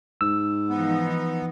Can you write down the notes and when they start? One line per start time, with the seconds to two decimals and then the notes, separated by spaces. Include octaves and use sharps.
0.21 G#2 E6
0.69 E3 F3 B3 D#4